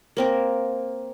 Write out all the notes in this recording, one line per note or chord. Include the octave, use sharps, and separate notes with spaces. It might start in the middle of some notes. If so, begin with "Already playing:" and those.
A#3 C4 A#4